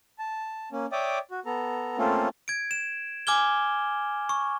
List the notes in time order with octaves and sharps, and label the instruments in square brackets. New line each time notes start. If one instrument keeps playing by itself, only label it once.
[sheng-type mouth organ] A5
A#3 C#4
C#5 D5 E5 G5 D6 D#6
F#4
B3 A4 A#5
A3 A#3 C4 C#4 F4 A4
[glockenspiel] G#6 D7
E7
G#5 D6 F6 G#6 G7
C#6